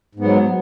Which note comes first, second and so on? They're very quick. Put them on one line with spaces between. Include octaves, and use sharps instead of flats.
G#2 B3 F#3